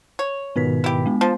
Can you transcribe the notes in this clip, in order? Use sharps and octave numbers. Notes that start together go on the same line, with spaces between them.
C#5
G#2 B2 D#3 B3 B4 B6
E4 G4
G#3 B3
F3 A5